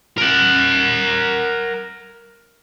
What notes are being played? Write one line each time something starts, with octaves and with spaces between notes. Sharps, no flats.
A#4 F#5